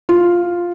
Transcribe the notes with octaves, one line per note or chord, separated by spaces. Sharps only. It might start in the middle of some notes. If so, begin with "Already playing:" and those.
F4